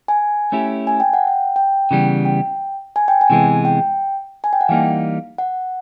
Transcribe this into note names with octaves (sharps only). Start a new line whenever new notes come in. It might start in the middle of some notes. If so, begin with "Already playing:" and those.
G#5
A3 C#4 E4 G4
G#5
G5
F#5
G5
G5
C#3 E3 G3 B3
G5
G#5
G5
G#5
C3 E3 G#3 B3
G5
G#5
G5
F#5
E3 G3 A#3 D#4 F5
F#5